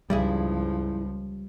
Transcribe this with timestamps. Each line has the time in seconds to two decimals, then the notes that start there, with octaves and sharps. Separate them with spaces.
0.10 C#2 G2 F3 G3 E4 G#4